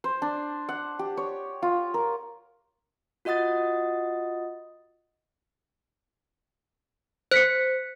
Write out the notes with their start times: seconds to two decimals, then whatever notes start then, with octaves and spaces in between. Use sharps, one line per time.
0.04 C5
0.22 D4
0.69 F#5
0.99 G4
1.17 C#5
1.62 F4
1.94 A#4
3.25 F4 F#4 D#5 F#5 D#6 A6
7.32 C5 F#6 B6 C#7